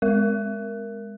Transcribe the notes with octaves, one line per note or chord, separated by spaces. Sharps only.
G#3 A#4